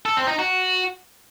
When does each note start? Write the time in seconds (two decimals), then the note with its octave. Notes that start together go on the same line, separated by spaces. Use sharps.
0.06 A4
0.17 C4
0.28 D#4
0.39 F#4